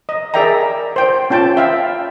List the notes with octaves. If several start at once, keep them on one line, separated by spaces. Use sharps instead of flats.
D#5
G#4 A#4 D5 E5 G5 A#5
C5 G5
C#4 F4 G5 A5
E5 F5 G5